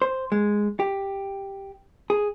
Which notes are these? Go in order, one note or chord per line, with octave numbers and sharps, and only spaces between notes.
C5
G#3
G4
G#4